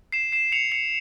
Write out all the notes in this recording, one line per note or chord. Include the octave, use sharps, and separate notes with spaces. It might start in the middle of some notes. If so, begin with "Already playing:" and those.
C7 E7
C7 E7
C#7 F7
C#7 F7